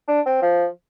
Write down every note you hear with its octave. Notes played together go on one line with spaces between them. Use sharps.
D4
C4
F3